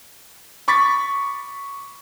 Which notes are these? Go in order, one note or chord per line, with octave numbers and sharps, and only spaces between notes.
B5 C#6 D6 A6 B6